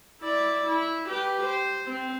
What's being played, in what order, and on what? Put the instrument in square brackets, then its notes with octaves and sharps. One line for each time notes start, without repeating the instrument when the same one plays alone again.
[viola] E4 D5
E4
G4 B4
C5
C4